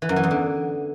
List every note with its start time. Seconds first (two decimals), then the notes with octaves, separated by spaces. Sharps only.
0.02 E3
0.09 F#2
0.16 E3
0.23 E2
0.31 D3